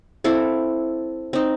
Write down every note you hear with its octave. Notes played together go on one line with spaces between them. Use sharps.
C4 E4 A4 F5
C4 D#4